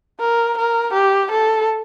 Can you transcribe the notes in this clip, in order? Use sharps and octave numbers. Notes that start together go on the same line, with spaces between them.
A#4
A#4
G4
A4